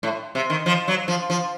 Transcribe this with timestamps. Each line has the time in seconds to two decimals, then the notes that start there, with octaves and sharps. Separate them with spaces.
0.03 A2
0.35 C3
0.50 D#3
0.66 F3
0.88 F#3
1.08 F3
1.30 F3